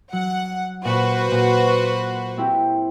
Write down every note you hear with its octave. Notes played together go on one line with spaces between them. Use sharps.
F#3 F#5
A#2 F#4 B4 C5 F#5
A#2
C4 E4 G4